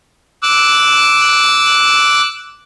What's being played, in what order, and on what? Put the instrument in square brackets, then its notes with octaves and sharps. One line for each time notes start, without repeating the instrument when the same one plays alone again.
[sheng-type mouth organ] D6 E6 F#6